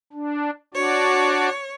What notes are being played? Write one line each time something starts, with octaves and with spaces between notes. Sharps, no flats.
D4
D4 F#4 C#5 D5